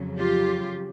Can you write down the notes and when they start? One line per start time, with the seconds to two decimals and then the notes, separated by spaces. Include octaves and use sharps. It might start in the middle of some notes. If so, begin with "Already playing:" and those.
Already playing: F2 C#3 F#3
0.19 F4 G4